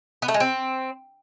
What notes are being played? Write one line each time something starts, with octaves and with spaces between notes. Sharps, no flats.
B3
A3
G#3
C4